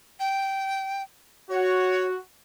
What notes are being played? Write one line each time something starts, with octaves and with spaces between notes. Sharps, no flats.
G5
F#4 C#5